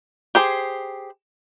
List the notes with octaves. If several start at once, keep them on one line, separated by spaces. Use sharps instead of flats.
G4 G#4 C5